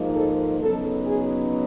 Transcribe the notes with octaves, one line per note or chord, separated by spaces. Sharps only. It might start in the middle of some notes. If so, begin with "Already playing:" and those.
Already playing: G#2 F3 A#3 D#4
A4
C#3 F#3 B3 D#4 A4
G#4